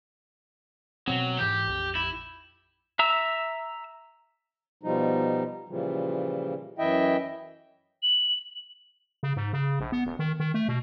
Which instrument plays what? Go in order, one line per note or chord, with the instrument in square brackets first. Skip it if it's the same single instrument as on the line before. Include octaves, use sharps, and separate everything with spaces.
[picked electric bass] B2 C4 [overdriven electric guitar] F#3
[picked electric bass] G#2 E3 [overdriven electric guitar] G4
[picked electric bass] A#1 F2
[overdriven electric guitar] E4
[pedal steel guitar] E5 A#5 E6
[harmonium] B2 F3 G3 D#4
A#2 C#3 E3 F3 G3
F#2 E3 E4 D#5 E5 G5
[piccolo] F#7
[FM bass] C#3
G#2
C#3
A#1
B3
E1
D#3
D#3
A3
B2